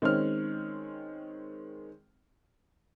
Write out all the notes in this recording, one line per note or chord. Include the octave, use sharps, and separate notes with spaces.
D#3 G#3 C4 C#4 F6